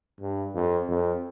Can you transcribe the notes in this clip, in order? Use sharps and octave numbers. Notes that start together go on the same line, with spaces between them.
G2
F2
F2